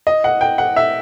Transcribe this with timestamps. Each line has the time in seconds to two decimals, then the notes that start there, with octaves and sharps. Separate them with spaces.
0.07 D#5
0.24 F#5
0.41 G5
0.58 F#5
0.76 E5